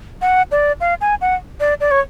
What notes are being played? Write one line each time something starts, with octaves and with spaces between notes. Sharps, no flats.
F#5
D5
F5
G#5
F#5
D5
D5
C#5